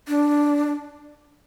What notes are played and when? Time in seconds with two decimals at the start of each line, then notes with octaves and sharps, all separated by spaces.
0.08 D4